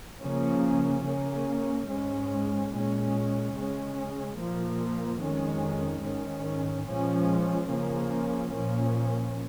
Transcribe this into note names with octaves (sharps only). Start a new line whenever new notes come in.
C#3 F3 A#3 C#4
C#3 A#3 C#4
G#2 G#3 C#4
A#2 G#3 C#4
C#3 G#3 C#4
A#2 F3 A#3
F2 D#3 G#3 C#4
G#2 D#3 C#4
A#2 F3 G#3 C#4
C#3 F3 A#3 C#4
A#2 F3 A#3 C#4